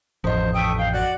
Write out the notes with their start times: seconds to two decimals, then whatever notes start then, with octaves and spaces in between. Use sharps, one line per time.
0.24 A1 F2 F3 C5 D#5
0.54 A3 G5 D#6
0.78 F5 G5
0.93 F#4 D5